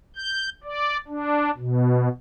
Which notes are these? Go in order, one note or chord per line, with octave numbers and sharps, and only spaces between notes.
G6
D5
D4
B2